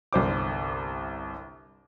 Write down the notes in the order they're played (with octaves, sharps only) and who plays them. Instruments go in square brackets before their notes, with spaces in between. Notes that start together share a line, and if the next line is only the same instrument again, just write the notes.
[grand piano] G1 C2 C5 D6